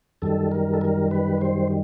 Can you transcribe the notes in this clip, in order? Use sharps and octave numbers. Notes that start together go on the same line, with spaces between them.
F#2 D#3 G3 A4
A#4
A4
A#4
B4
C5